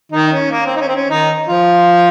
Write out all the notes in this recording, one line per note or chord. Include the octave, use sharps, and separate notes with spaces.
D#3 D#4
D#4
C#4
A#3
C4
D#4
C#4
C4
C#4
D#3 D#4
F3 F4